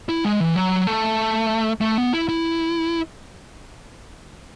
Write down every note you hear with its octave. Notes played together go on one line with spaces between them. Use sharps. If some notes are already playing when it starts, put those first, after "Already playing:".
E4
G#3
E3
F#3
A3
A3
B3
E4
E4